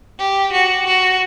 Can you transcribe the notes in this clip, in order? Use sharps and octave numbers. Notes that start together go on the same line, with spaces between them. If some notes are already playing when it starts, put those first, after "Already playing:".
G4
F#4
F#4